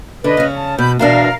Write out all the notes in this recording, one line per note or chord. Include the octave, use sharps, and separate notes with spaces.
D3 B4 D#5
C#3 C#4
A5
B2 B5 G6
E2 B2 D4 A#4 F5